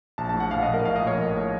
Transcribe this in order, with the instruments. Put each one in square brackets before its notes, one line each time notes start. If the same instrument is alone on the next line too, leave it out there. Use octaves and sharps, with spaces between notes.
[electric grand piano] A#1 A5
A5
A2
F#5
A#1 F5
D#5
A#1
A#4
A2 F5
D#5
A#1
C#5
A#1
A2